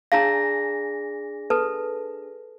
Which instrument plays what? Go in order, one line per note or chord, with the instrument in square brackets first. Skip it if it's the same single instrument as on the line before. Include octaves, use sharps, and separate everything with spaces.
[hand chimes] D4 G#4 A#6 [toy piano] F5 A5 A#5
[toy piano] A4 B4 A5